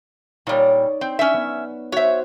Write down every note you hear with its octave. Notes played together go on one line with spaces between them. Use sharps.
A#2 G3 D#4 C#5 D5
C4
C#4 E5
B3
F#4 C5 C#5 E5